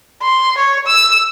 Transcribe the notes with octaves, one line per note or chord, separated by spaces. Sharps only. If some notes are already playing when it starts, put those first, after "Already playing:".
C6
C#5
E6